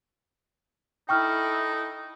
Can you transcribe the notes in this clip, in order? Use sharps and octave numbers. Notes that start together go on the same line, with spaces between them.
D#4 E4 A4 G5 C#6 F6